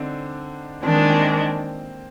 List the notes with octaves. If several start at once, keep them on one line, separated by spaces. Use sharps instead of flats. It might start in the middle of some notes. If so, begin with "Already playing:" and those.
Already playing: D3 C4 D4 D#4
D#3 G#3 C4 D4
A#3
C4